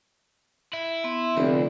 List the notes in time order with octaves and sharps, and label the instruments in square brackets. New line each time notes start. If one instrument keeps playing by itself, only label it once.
[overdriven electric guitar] E4
[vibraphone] B3 E5 C6
[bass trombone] F1 [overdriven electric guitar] D2 [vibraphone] C4 D5